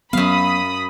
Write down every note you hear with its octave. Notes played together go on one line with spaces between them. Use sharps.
F#2 F#3 B3 F5 B5 D#6